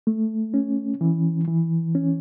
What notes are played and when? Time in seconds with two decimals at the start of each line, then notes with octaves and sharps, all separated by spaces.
0.07 A3
0.54 C#4
1.01 E3
1.48 E3
1.95 C#4